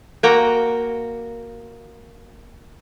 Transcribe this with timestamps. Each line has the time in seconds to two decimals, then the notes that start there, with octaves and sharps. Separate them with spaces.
0.23 A#3 F#4 G5 A#5